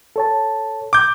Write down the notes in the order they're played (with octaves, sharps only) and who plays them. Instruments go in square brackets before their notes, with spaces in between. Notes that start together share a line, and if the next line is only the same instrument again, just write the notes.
[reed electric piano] A4 C#5 A5
[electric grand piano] D6 G6